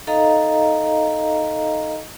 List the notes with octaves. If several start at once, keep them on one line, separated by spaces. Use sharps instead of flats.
D#4 A4 D#5 F5 A#5